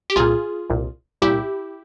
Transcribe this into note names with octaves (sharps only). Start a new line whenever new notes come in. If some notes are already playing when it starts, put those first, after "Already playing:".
G4
C2 A#2 F4 G#4
C2 A#2
C2 A#2 E4 G4